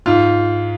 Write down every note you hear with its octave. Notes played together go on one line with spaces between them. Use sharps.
G#2 F4